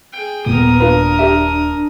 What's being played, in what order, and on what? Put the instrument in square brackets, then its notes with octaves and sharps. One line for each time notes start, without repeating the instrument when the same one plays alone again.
[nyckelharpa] G#4 G5
[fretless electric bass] D#1 A#2 A#3 [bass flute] B3 [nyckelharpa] A#4 D#6
[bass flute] D4 [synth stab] F4 B4
[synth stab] G4 E5